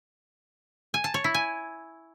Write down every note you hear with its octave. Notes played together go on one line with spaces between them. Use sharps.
G#5
A5
C#5
E4
G#5